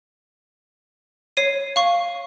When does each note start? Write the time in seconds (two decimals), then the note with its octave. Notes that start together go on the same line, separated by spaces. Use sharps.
1.37 C#5 C7 D#7
1.76 F5 C#6